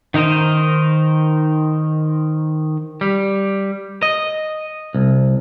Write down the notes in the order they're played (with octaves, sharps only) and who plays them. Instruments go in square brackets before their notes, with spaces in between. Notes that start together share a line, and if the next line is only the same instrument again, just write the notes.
[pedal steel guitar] D#3 D#4 A#4 C5 D#5
[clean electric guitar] G3
D#5
C2